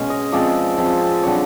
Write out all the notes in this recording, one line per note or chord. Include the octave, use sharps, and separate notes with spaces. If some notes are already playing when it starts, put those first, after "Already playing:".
Already playing: B2 G#3 C#4 G#5
D#5
F3 G#3 C4 D5
F3 G#3 C4
D3 G3 C4 C#5